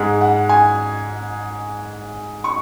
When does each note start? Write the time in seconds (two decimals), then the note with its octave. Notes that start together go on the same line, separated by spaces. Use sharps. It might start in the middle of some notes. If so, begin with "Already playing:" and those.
Already playing: G#2 G#3
0.21 F#5
0.49 G#5
2.44 C#6